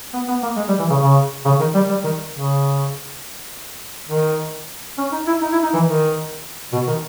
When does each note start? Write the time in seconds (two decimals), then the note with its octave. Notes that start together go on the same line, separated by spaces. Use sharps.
0.13 B3
0.28 B3
0.43 A#3
0.57 G#3
0.68 G3
0.79 E3
0.90 C#3
1.01 C#3
1.45 C#3
1.60 D#3
1.74 G3
1.89 G3
2.04 D#3
2.33 C#3
4.08 D#3
4.98 C#4
5.12 D#4
5.27 E4
5.41 D#4
5.52 E4
5.63 D#4
5.74 E3
5.85 D#3
6.73 B2
6.88 D#3